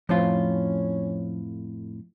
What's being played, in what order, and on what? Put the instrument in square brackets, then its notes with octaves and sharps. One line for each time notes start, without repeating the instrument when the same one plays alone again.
[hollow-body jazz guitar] F2 A2 F4 [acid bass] F3 [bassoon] C#4